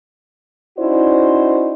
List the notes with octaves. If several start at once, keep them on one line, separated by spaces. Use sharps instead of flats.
C#4 D#4 E4 F#4 C5 D5